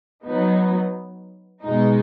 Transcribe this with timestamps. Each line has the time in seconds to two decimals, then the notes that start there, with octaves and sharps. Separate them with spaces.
0.24 F#3 B3 D#4
1.62 B2 G#3 D#4